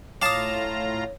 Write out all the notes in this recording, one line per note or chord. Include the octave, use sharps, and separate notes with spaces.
A2 F4 C#5 F5 A5 A#5 D6 D#6